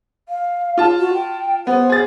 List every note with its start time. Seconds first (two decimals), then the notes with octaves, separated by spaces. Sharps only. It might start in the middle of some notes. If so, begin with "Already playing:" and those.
0.29 F5
0.77 F4 A5
0.99 F#4
1.14 G5
1.67 B3 C5
1.90 G#4 A6